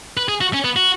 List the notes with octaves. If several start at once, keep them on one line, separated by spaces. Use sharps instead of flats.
B4
G#4
F#4
C#4
B3
F#4